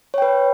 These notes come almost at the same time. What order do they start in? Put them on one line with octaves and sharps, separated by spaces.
C#5 G5 B4